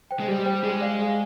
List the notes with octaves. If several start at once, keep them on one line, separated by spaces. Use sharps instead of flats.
C5 G5
G#3
G3 G4
C5 G5
G#3 G#4
D5 F5
G#4